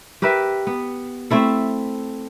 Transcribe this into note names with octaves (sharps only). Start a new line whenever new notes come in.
G4 A#4 B4 E5
B3
A3 C4 E4 A4